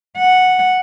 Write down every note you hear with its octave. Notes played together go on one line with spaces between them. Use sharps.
F#5